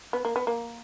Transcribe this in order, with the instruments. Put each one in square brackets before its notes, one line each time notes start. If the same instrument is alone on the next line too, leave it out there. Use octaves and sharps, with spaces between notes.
[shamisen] B3
A#3
B3
A#3